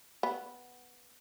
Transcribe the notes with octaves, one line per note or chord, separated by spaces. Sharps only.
B3